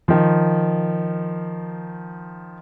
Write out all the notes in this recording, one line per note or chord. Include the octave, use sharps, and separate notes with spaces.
D#3 F3